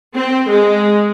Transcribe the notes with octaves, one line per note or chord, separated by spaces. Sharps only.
C4
G#3